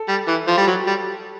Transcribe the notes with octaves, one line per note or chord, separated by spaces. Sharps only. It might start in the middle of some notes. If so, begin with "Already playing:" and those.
Already playing: A4
G3
E3
F3
G3
F#3
G3